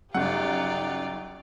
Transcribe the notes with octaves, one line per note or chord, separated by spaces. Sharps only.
G1 C#3 F#3 D#4 F4 G4 D5 F#5